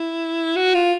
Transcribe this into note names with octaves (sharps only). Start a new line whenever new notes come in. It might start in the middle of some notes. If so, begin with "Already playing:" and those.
Already playing: E4
F#4
F4